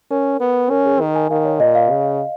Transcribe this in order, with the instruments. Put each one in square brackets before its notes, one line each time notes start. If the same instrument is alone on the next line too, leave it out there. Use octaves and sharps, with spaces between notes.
[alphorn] C#4 [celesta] A#4
[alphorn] B3
[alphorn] C#4 [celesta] A#4
[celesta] G#4
[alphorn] D#3 [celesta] A#4
[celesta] G#5
[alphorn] D#3 [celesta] F5
[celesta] C#5
[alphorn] A#2 [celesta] D#5
[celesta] F5
[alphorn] C#3